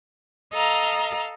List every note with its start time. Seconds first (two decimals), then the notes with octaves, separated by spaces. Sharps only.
0.53 A4 D#5 F5 A#5